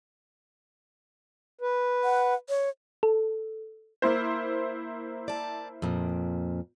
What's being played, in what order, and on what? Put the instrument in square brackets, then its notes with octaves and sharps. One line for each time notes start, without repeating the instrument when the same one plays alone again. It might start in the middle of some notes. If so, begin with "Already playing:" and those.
[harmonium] B4
[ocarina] F#5
C#5
[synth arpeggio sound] A4
[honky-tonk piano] A#3 E4 C5
[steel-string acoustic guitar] D5 A5
F2 A#2